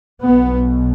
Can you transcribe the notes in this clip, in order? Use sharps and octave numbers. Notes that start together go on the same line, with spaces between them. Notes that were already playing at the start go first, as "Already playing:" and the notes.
B1 B2 B3